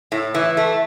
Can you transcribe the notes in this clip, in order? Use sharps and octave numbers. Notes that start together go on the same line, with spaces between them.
A2
E3
A3